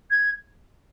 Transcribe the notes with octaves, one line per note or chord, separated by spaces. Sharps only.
G#6